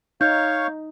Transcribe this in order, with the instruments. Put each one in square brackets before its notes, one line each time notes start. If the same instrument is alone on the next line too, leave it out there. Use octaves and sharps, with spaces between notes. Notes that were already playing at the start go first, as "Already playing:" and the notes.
[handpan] D#4 [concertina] C#5 F5 C#6 [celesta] G6